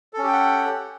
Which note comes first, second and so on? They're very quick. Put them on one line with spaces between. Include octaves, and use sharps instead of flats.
A4 C#4 G4 G5 F#5